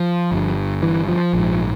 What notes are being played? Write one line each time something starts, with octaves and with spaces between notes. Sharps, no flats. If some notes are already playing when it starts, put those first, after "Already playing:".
Already playing: F3
G1 G2
E3
F3
A#1 G#2